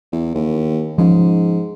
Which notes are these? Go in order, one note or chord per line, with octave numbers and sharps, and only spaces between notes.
E2
D#2
G#2 F3 C#4